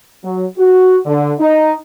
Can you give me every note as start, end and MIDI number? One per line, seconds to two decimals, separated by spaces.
0.23 0.44 54
0.57 0.98 66
1.06 1.33 50
1.39 1.75 63